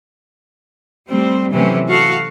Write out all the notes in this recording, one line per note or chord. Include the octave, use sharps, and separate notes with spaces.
G3 A3 C4
C3 E3 F#3 A3 C#4
F#4 A4 F5